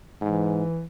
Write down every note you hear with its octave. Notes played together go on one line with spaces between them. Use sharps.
G#2 E3